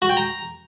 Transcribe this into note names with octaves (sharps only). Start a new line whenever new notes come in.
F#4
G5
A#5